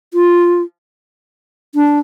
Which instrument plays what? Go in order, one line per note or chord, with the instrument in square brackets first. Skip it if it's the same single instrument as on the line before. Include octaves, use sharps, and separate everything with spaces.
[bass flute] F4
D4